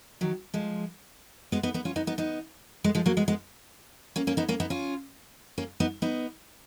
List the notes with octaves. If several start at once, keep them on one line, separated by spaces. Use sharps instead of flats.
D#3 F#3
F3 G#3
G#3 B3
B3 D#4
B3 D#4
C#4 F4
B3 D#4
B3 D#4
B3 D#4
G#3 B3
F3 G#3
F#3 A#3
G#3 B3
G#3 B3
A#3 C#4
A#3 C#4
B3 D#4
A#3 C#4
B3 D#4
C#4 F4
A#3 C#4
B3 D#4
B3 D#4